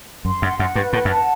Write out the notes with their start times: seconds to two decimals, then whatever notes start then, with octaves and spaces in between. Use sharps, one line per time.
0.25 F#2 C6
0.42 F#2 F#5
0.58 F#2 F#5
0.75 G2 B4
0.93 A2 F#5
1.05 F#2
1.10 A5